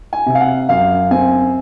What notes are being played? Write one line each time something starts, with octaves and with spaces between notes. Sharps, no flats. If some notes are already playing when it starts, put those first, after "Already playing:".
G#5
C3
F5
F#5
F#2 F5
C4 G#5